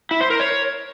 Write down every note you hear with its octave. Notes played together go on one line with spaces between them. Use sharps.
E4
C5
A#4
C#5